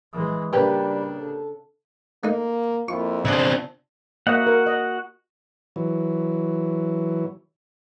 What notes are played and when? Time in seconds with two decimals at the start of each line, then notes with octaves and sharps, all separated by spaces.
0.13 E3 G#3
0.53 C#3 G3 A#3 D4 G4 B4
1.18 A4
2.24 A3 A#3 D#4
2.88 F2 A#3 E4 F4 C#6
3.25 C#3 F3 C4 D4 E5 F#5 D#6
4.27 A#3 F#4 D#5 E5 F#5
4.47 A#4
4.66 D#5
5.76 E3 F#3